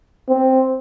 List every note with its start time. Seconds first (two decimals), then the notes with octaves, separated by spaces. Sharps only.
0.29 C4